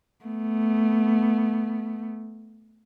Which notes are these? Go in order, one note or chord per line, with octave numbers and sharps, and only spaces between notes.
A3 B3